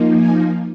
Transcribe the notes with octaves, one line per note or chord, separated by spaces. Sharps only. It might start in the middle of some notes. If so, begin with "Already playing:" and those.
Already playing: F3 A#3 D#4
G#5